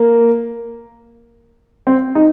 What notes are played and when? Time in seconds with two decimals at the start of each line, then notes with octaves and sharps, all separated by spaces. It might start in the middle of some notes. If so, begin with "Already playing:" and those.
Already playing: A#3
1.87 C4
2.15 D#4